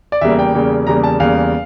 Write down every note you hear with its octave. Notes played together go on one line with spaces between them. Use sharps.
D5
E2 C#3 G3 A#3 E5
G5
E2 C#3 G3 A#3
E2 C#3 G3 A#3 A#5
A5
E2 C#3 G3 A#3 F5